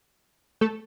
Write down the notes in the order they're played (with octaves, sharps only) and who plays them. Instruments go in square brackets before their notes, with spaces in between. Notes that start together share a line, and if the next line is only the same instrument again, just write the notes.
[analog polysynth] A3 A4